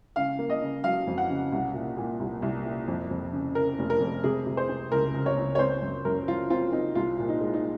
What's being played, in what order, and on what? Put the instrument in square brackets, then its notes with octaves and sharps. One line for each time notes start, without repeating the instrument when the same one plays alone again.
[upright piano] C#3 F5
A#3
D#5
C#3
F#3 F5
F2
F#5
C#3
C2
A#2
A#2
C2
C2
A#2
F2
F2
C#3
C#3 A#4
F1
A#4
F2
C3 G#4
C3
C5
C4
C#2 A#4
C#2
C#5
C#2
C#5
C4 C5
F#2
F#2 A#4
F3 F4
C4 F4
C4 D#4
C2 F4
A#2
D#4
G#3
D#4